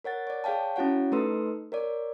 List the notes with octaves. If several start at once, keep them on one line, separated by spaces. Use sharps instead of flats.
A#4 C#5 F#5 A6
C#5 D5
G#4 C#5 F5 G5 A5
C#4 E4 F#4 C#5 F#5
A3 D#4 A4 B4 C6 E6
A#4 C#5 D5